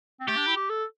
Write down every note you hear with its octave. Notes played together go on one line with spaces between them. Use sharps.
C4
A3 G4
D4
E4
G4
A4